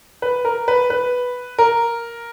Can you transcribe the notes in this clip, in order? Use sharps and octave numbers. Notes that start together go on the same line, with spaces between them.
B4
A#4
B4
B4
A#4